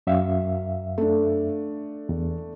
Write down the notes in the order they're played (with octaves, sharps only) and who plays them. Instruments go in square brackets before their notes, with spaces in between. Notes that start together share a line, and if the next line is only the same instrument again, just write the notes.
[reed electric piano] F#2 E5 F5
[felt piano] A3 D4
[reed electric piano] E2